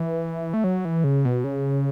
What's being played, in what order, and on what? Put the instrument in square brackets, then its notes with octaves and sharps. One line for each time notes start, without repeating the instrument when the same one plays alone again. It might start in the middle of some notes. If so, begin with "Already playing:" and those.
Already playing: [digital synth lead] E3
A3
F#3
E3
C#3
B2
C#3